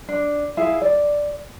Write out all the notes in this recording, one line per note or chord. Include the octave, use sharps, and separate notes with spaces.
D4
E4 G#4 F5
D5